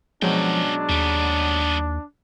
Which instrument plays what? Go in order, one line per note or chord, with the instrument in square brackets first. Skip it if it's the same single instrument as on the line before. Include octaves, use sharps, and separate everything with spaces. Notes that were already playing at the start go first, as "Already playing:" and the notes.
[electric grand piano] B2 F#3 G#3 [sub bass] F3 [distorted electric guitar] C#4 G5 [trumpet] D4
[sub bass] D#2 [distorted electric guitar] G3 B3